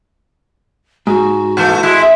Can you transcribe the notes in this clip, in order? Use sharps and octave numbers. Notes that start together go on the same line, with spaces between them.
G#2 F#4
A#2 E3 A3
G#3 E4
E5